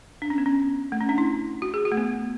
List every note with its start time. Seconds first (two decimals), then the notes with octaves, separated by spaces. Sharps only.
0.22 D4
0.30 C#4
0.38 B3
0.46 C#4
0.92 A3
1.01 C#4
1.09 D4
1.18 E4
1.62 F#4
1.74 G#4
1.85 F#4
1.92 A3
1.97 B3